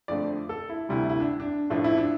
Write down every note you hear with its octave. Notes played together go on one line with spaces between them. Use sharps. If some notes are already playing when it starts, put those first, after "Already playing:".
F2 D3 F3 A3 D5
A4
E4
D2 C3 G3 E4
E4
D4
D4
A1 A2 F3 A3 D4
E4
D4